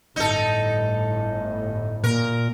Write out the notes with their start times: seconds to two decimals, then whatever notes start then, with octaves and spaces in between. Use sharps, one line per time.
0.16 G1 A2 D#4 A4
2.04 A#2 A#4